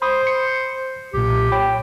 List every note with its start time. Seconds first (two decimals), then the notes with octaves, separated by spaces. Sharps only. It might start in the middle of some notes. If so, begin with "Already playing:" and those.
0.02 C5 B5 C6 D#6
0.27 C#7
1.14 B1 A#2 G4
1.52 C#5 G5 B5